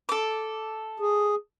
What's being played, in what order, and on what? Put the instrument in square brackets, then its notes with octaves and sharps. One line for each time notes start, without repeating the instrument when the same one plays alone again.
[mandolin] A4 D6
[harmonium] G#4